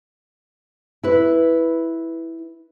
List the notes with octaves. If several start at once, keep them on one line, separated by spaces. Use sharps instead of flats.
E4 B4